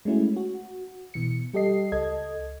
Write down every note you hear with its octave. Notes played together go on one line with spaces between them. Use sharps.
G#3 A3 C#4 E4 F#4
F#4
B2 E3 C#7
G3 G4 A4 D#5 C7
C#2 A4 D#5 G#6